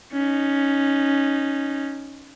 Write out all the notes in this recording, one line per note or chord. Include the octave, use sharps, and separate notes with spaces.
C#4 D#4